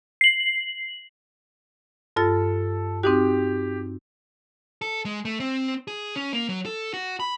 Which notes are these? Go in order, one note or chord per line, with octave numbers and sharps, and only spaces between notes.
C7 F#7
G2 F4 A4 A6
C4 D#4 F#4 G4
A4
G#3
A3
C4
G#4
C#4
A#3
F#3
A4
F#4
B5